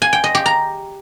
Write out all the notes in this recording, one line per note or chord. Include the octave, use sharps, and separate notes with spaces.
G#5
G5
D#5
G4
A#5